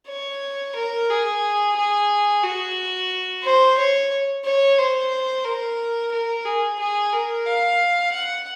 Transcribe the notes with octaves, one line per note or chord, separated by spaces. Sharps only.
C#5
A#4
G#4
G#4
F#4
C5
C#5
C#5
C5
A#4
A#4
G#4
G#4
A#4
F5
F#5